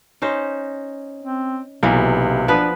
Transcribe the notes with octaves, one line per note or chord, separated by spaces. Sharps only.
C#4 D#4 C5
C4
B1 C3 E3 A#3
F3 B3 D4 B4